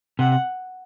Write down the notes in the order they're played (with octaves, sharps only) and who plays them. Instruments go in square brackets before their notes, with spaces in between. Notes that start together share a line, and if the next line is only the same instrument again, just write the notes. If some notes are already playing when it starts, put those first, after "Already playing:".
[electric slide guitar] C3 [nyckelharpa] F#5